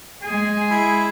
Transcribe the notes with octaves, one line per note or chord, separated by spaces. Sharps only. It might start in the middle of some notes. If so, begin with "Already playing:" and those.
G#3 G#4 G#5
E4